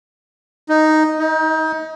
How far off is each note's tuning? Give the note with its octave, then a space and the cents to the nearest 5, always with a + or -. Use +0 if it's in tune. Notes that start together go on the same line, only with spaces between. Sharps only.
D#4 +0
D#4 +30